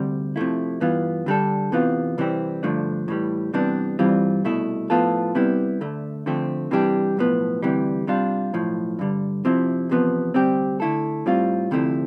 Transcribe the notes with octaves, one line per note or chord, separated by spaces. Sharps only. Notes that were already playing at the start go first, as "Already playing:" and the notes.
Already playing: D2 C3 G3
C3 F3 A3 E4
G2 E3 B3 F4
D3 G3 D4 A4
E2 C3 E3 B3 F4
C2 C3 E3 G3 C4
G2 D3 F3 A3 D4
A2 E3 G3
C3 E3 G3 B3 D4
G2 E3 G3 C4 F4
C2 B2 A3 E4
A2 F3 B3 F4 A4
C3 G3 B3 E4
D2 D3 A3
D3 F3 A3 C4
C3 E3 G3 D4 G4
B1 A2 F3 B3
D2 C3 E3 G3
C3 G3 D4 F4
B1 A2 F3
G2 D3 G3
C3 F3 C4 E4
E2 C3 F3 B3
D2 C3 G3 C4 G4
D3 A3 E4 A4
A2 G3 C4 F4
D2 C3 F3 A3 E4